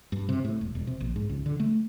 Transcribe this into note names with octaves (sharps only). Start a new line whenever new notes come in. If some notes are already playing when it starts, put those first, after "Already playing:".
G2
C3
A2
E1
E1
C3
A#1
G#2
C#2
D3
A3